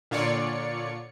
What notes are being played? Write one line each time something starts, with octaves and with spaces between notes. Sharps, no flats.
A#2 D3 F4 C#5 D5 C#7